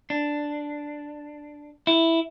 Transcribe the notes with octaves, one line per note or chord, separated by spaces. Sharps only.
D4
E4